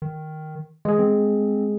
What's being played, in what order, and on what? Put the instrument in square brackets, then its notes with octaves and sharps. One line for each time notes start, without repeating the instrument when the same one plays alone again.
[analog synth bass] D#3
[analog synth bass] E3 [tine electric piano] G#3 G#4
[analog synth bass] C4